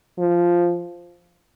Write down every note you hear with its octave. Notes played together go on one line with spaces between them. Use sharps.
F3